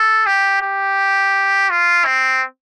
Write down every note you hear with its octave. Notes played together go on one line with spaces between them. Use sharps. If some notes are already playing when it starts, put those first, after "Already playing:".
Already playing: A4
G4
G4
F4
C4